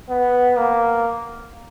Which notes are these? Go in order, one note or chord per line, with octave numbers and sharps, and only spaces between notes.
B3
A#3